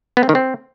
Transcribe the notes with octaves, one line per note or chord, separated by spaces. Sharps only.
B3
C4
D#3
C4